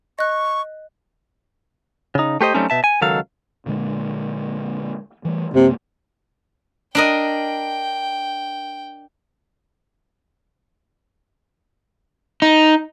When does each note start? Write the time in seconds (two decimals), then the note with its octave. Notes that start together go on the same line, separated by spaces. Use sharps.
0.19 D#5 C#6 F#6
2.15 C#3 D#4
2.41 A3 G4 C5 D#5
2.54 F#3 G3 A3 C4 C#4 D#4
2.70 B2 E5 A5
2.84 G#5
3.01 C#2 D#3 F#3 A4 F5
3.66 A#2 D3 G#3
5.25 E3 G3 A3
5.54 F#2 C3 G#3 A#3
6.95 D4 A#4 D#5 G5
12.42 D#4